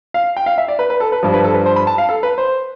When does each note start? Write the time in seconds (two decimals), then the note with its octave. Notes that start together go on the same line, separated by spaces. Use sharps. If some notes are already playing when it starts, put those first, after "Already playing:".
0.14 F5
0.37 G5
0.46 F5
0.58 E5
0.68 D5
0.79 B4
0.90 B4
1.00 A4
1.12 B4
1.23 G2 F3
1.34 B4
1.44 A4
1.54 B4
1.66 C5
1.76 B5
1.87 A5
1.98 F5
2.09 A4
2.23 B4
2.38 C5